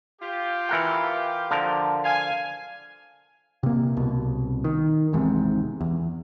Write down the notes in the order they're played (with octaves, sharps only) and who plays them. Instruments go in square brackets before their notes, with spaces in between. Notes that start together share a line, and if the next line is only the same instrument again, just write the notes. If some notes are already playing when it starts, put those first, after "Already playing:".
[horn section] F4 G4
[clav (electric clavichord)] E3 A#4 F#5
D3 F3 A#4
[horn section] F5 G#5
[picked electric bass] C3 A#3
C2 B2
D#3
G#1 E2 G#2 C3
E2